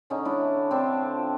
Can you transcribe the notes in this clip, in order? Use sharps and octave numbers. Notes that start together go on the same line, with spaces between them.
D3 C#4 D#4
A3 D4 E4
A3
D3
A3 C4 D4
D3
D3
F3